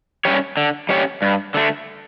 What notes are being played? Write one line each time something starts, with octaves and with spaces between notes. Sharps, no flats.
G3 C#4 G4 C#5
D3
G3 C#4 G4 C#5
G2
D3 A3